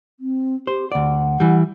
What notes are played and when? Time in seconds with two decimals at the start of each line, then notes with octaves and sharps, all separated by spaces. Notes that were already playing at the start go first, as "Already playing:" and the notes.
0.20 C4
0.67 G4 C5
0.92 D2 D5 F#5
1.40 E3 G3